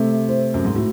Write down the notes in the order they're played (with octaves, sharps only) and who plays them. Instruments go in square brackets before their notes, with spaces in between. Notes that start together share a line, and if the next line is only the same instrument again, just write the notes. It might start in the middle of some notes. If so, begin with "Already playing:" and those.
Already playing: [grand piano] C3 [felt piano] A3
[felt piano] C5
[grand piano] F#2
G#2
[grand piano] A2 [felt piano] F#4